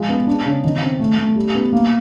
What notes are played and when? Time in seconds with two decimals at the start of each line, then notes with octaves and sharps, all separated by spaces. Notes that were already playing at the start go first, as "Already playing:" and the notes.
Already playing: F3 G#3
0.09 B3
0.27 D4
0.46 C#3
0.64 D#3
0.82 C4
1.00 A3
1.18 A3
1.36 G3
1.55 B3
1.73 A#3